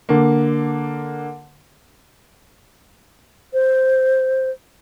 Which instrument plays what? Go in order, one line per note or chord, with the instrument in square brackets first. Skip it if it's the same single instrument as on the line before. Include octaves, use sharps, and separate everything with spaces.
[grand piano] D3 A#3
[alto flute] C5